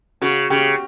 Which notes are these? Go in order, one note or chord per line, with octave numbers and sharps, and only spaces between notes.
C#3 F#4
C#3 G4